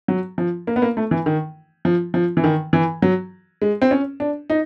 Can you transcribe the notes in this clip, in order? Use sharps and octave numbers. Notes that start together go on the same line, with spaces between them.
F#3
F3
A#3
B3
A#3
A3
E3
D#3
F3
F3
E3
D#3
E3
F#3
G#3
C4
C#4
D4
D#4